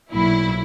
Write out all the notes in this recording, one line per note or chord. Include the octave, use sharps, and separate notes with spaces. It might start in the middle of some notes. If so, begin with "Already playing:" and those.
B1 A#2 F#3 E4